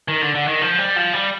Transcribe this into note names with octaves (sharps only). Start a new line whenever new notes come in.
D#3
D3
D3
D#3
F3
G3
F3
G3